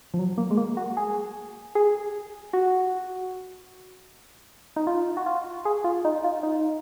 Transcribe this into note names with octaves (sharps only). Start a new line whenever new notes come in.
F3
F#3
A#3
G#3
A#3
F#4
G#4
G#4
F#4
D#4
F4
F#4
F4
G#4
F4
D#4
F4
D#4